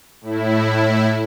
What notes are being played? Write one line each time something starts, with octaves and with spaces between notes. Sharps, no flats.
A2 E4